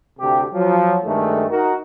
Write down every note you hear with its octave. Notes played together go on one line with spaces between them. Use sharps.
D2 C3 G4
F3 F#3
G2 D#3 G#3 A3
D#4 F#4 A#4